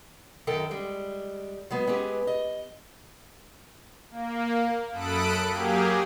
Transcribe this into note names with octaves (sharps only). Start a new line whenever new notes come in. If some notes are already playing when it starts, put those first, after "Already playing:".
F#2 D#3 A4 A#4 G5
G3 G#3
F#3 G#3 B3
G#3 B3 C#4 G4 G#4
D#5
A#3
F#2 A4 B5 D#6 F#6 D7
F#3 A#3 G4 G#4